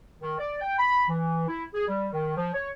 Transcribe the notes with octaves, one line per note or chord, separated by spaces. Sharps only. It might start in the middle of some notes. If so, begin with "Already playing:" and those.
D#3
D5
G5
B5
E3
E4
G#4
G3
D#3
F3
C#5